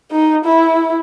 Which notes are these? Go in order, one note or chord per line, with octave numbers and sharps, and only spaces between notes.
D#4
E4